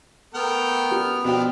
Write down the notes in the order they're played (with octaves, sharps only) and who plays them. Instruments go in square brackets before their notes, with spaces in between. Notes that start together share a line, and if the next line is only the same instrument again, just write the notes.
[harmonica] A3 A#4 G5 [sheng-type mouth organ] B3 F6
[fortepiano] G3
[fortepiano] B2 G5 [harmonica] F3 C4 D4